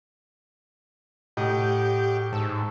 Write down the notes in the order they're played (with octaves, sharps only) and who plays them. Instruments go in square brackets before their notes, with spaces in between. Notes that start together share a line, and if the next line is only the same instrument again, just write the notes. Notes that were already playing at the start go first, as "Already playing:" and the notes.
[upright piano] A2 [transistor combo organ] G4 [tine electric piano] D#5 F#5 D#6
[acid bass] G#2 [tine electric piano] A5 C#6 E6